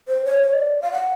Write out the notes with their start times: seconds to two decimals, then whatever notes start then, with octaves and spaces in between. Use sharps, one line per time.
0.08 C5
0.25 C#5
0.42 C#5
0.53 D#5
0.58 D5
0.82 F5
0.92 F#5